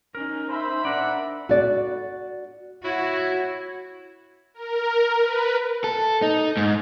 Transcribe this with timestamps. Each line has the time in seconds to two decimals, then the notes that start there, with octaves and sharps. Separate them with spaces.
0.15 C#4 D#4 A#4
0.48 C5 E5 B5
0.85 D4 A#4 D5 F#5
1.49 F#4 D5
2.85 E4 F#4 C#5
4.54 A#4
5.20 B4
5.84 A4
6.22 D#4
6.57 G#2